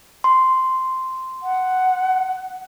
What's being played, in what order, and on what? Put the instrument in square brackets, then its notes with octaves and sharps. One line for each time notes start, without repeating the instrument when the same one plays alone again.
[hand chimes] C6
[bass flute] F#5